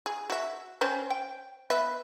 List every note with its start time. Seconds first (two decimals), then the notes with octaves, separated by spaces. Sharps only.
0.06 G#4
0.30 F#4 E5
0.81 C4 C#4 C5
1.10 G5
1.70 B3 B4 E5